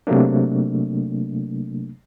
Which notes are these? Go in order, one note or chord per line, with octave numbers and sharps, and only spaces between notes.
C3 F#3 A3 A#3 D4